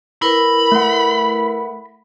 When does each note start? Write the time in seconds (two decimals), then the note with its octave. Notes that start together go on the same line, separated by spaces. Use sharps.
0.22 E4 A#4 B4 B5
0.72 A3 F#5